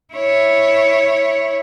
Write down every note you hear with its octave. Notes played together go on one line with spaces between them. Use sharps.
E4 C#5